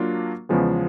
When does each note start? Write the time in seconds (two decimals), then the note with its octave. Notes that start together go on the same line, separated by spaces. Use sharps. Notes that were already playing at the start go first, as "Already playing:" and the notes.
Already playing: F#3 A#3 D4 F4
0.49 E2 C#3 F3 G#3 B3